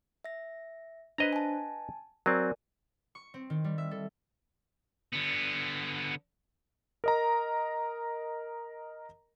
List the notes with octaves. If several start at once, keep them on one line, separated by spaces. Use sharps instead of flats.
E5 A#6
D4 B4 C5 D#5 A#5
G#5 A5
F#3 C4 A#4 D5 G#5
C#6
C4
D#3
G3
E5
A4
D3 B3
A#4 D#5 A#5